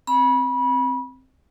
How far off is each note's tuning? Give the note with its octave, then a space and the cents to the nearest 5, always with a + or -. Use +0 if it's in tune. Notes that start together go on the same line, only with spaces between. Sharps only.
C4 +0 B5 -25